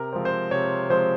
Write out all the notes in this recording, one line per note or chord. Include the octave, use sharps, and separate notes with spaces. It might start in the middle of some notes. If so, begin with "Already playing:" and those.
Already playing: C3 A#4
F3 G#3 C4
C5
C3 C#5
F3 G#3 C4 C5